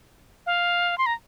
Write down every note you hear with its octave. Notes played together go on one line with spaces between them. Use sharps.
F5
C6
A#5